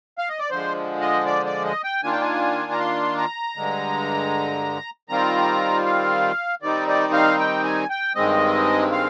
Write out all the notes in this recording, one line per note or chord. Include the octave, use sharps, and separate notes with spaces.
F5
D#5
D5
D3 F3 G#3 C5
D#5
D5
D5
D#5
G5
D#3 A#3 D4 F4 G#5
G5
G#5
A#5
C6
A#5
G2 D3 G#3
D#3 G3 C4 F4 A#5
F5
D#3 G3 C4 D#4 D5
D5
F5
G5
G#5
G5
G2 D#3 G#3 C4 D#5
F5